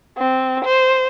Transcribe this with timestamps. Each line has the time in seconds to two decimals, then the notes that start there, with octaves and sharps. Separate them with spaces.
0.18 C4
0.65 C5